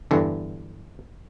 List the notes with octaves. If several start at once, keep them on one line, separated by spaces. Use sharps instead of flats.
E2 G2 D3